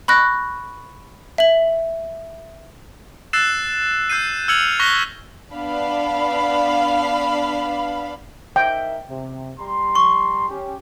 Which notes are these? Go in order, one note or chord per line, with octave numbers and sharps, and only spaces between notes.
B5 C#6 F#6 A#6
E5 F#7
E6 F#6 A6 C7 E7
E6 G6 C7 D#7
E6 F6 G#6 C#7 F7 F#7
C#6 F#6 A#6 B6 G7
B3 D4 F5 B5
D#4 A#4 E5 G5
C3
G3 A#5 C6
C#6
C#4 G4